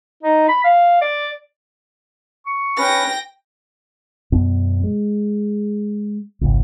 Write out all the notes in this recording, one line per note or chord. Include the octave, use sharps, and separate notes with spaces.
D#4
B5
F5
D5
C#6
C#4 B4 G5 A#6
F#2 B2 B3
G#3
G#1 C#2